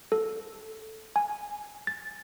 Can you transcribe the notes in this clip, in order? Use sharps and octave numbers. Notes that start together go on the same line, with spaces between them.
A4
G#5
A6